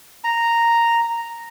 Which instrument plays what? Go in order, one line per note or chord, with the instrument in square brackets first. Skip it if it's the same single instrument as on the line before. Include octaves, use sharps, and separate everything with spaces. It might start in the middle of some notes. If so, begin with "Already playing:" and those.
[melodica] A#5